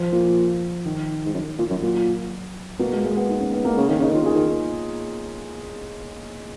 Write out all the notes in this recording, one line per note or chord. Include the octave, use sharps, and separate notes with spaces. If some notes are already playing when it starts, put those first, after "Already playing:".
Already playing: F3
A#2
D#3
G#2
F#2
A#2
F#2
A#2 F#3
B2 A#3
G#3
G#3
B3
D#4
C#4
B3
A#3
C#3
D#3 C#4
C#3 D#4
D#3 F4
C#3 G#4
D#3